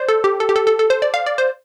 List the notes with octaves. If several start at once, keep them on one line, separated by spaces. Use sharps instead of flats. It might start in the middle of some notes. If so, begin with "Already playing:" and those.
Already playing: C5 D5
A4
G4
A4
G4
A4
A4
A4
C5
D5
F5
D5
C5